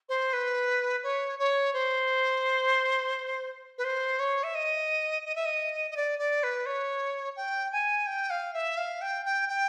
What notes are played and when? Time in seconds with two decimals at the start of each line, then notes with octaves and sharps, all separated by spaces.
0.08 C5
0.33 B4
1.03 C#5
1.38 C#5
1.73 C5
3.78 B4
3.84 C5
4.19 C#5
4.43 E5
4.54 D#5
5.25 D#5
5.35 E5
5.45 D#5
5.90 D#5
5.96 D5
6.18 D5
6.43 B4
6.65 C#5
7.36 G5
7.72 G#5
8.06 G5
8.30 F5
8.53 E5
8.77 F5
9.01 G5
9.25 G5
9.48 G5